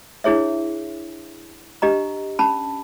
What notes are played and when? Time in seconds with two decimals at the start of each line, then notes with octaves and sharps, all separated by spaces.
0.24 D4 E4 G#4 C#5 E5
1.82 D4 G4 D#5 A#5
2.39 C#4 A5 B5